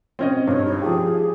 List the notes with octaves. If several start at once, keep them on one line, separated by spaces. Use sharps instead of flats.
C4 C#4 D#5
G2 C#5
D#4
F3 G4 G#4